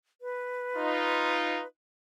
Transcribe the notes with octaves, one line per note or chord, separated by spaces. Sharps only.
B4
D#4 F4